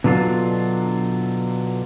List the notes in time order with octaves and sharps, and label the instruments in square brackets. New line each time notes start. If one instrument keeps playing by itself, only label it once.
[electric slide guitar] B2 D3 F#3 D4 F4